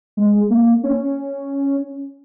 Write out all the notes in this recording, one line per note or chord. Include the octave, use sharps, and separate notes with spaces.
G#3
A#3
C#4